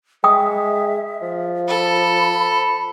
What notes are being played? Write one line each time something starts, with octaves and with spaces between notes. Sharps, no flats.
G#3 E5 G5 D#6
F3
A4 B5